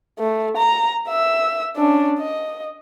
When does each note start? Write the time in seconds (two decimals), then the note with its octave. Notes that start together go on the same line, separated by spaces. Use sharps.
0.19 A3
0.57 A#5
1.09 E5 E6
1.76 C#4 D4
2.19 D#5